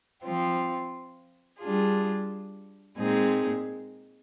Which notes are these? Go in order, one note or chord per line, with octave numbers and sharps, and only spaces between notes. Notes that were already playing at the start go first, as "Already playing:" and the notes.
F3 C4 F4
G3 D4 F4 G#4
A#2 G#3 C4 D#4 G#4